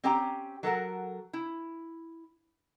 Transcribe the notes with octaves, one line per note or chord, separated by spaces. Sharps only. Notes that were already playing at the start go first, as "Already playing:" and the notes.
C4 C#4 G4 G5 A#5
F#3 A4 A#4 F#5
E4